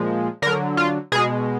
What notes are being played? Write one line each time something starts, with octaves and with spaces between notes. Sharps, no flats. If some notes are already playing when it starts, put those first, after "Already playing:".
Already playing: A#2 F3 G#3
D3 F#3 A#4
F4
B2 G#3 G#4